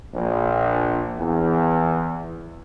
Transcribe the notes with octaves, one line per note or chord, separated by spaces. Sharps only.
A#1
E2